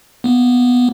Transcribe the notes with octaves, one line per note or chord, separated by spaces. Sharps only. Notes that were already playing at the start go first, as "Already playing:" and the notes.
A#3 B3